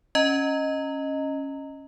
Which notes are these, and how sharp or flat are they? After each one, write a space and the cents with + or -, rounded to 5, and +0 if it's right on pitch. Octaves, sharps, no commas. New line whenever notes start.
C#4 -5 D#5 +0 A#5 -20